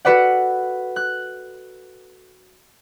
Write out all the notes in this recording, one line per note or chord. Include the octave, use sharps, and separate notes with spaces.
F#4 A4 B4 D5 F#5
F#6